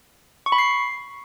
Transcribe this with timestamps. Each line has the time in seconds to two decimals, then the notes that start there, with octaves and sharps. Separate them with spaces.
0.46 C#6
0.52 B5
0.58 C7